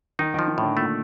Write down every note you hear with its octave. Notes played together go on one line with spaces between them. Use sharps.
D#3 D#4
D#3 F3
D#3
A2 D3
A#2 A3